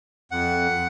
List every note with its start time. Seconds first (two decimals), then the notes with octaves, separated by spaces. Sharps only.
0.31 F2 F#5